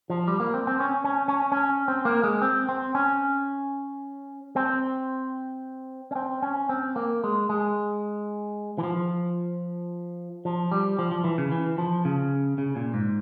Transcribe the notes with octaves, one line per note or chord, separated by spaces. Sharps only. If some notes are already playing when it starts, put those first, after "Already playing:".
F3
G3
A#3
C4
C4
C#4
C#4
C#4
C#4
C4
A#3
G#3
C4
C4
C#4
C4
C#4
C4
C#4
C4
A#3
G#3
G#3
E3
F3
F3
G3
F3
F3
E3
C#3
E3
F3
C#3
C#3
A#2
G#2